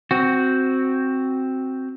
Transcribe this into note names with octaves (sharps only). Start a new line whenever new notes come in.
C4 F#4